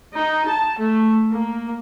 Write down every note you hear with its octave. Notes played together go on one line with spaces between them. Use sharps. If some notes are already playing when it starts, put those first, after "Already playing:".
D#4
A5
A3
A#3